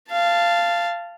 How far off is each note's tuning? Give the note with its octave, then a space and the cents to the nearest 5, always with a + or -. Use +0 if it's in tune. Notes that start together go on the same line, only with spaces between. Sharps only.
F5 -15 A5 +0